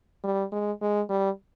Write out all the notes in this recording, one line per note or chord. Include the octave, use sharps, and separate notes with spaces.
G3
G#3
G#3
G3